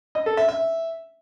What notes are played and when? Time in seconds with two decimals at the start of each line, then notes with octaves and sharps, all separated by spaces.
0.15 D#5
0.26 A4
0.37 E5
0.49 E5